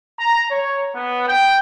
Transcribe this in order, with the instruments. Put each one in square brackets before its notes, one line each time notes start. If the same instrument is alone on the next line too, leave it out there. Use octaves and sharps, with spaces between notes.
[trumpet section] A#5
C#5
B3
G5